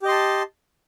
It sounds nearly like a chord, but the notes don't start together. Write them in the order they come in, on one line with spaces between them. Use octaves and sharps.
G4 D#5 C6 A5